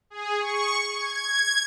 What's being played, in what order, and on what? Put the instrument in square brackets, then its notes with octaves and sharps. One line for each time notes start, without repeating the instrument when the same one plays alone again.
[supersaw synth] G#4
C#6
G#6